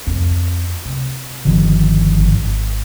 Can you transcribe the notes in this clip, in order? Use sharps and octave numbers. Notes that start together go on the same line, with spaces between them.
F2 F3
C3
G1 D#3 F3
G#1